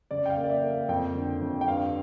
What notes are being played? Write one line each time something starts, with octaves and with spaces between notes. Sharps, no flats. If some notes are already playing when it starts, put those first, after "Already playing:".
C#3 D5
G5
F5
A#3
D5
E5
A#3
F5
F2 G5
D3
F2
G5
G2 F5